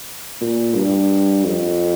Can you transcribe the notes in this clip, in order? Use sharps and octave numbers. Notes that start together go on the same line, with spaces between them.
A#2
G2
F2